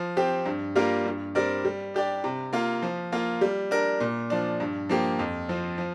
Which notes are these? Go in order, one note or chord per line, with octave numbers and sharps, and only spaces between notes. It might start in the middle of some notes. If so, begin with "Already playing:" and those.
Already playing: F3
C4 G4
G2
G3 A#3 F4 A#4
G2
G3 C4 A#4 D5
G3
D4 G4 D5
C3
A#3 F4
F3
A#3 F4
G3
D4 A#4
A#2
F3 D4
G2
F3 A#3 G4
F2
F3 C4
F3